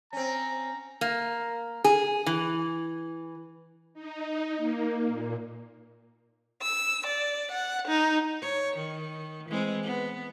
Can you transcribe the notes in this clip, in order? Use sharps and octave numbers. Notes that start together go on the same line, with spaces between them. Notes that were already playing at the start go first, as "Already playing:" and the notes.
C4 C#4 A#5
A#3
G#4
E3
D#4
A#3
A#2
E6
D5
F#5
D#4
C#5
D#3
E3 G#3 C4
B3